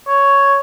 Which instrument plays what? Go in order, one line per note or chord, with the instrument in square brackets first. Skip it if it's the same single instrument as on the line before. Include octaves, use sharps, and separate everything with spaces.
[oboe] C#5